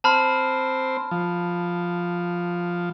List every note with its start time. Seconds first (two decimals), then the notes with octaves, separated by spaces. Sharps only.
0.04 C4 C5 A5 B5 F6
1.11 F3